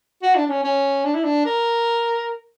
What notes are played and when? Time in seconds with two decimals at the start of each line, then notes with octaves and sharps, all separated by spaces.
0.23 F#4
0.36 D4
0.46 D4
0.50 C#4
0.64 C#4
1.05 D4
1.15 E4
1.24 D4
1.46 A#4